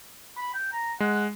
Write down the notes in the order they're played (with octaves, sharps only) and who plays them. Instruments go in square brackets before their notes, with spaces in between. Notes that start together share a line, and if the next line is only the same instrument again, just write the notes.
[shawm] B5
G5
A#5
[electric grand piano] G#3 [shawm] F#5